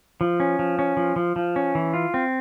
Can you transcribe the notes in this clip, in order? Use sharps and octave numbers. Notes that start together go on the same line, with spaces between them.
F3
C#4
F3
C#4
F3
F3
F3
C#4
E3
F4
C4